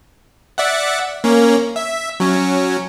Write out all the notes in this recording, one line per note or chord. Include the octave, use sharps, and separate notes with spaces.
D5 E5 F#5
A#3 C#4
E5
F#3 C#4